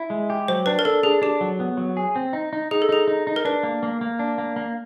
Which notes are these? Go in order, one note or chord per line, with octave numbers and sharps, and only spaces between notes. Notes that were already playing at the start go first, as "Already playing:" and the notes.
Already playing: E4
G#3
G4
F#3 C5
D4 B4
A#4
D4 A4
D4 G#4
D4 G4
F#3
B3
F#3
G#4
C4
D#4
D#4
D#4 G#4
A4
D#4 G#4
D#4
D#4
A#4
D4 B4
A#3
A#3
A#3
D4
A#3
A#3